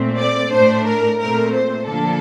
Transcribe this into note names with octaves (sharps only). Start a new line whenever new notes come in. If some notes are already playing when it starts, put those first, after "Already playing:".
Already playing: A#2 A3 C4
D5
A2 A3 D4 C5
A#4
A#2 A3 C4 A#4
C5
D3 F3 A#3 D4 A4